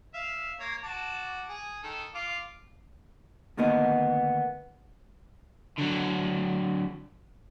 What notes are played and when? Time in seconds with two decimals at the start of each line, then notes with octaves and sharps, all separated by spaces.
0.14 E5 F5
0.60 A#3 C#5
0.83 F#4 A5 D6
1.49 G#4
1.83 D#3 A4
2.14 F4 F5 D6
3.57 D2 D#3 A#3 B3 D#5
5.78 D3 F#3